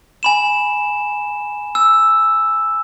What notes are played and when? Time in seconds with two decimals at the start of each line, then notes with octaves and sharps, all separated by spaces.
0.23 G#5 B5 E7
1.75 E6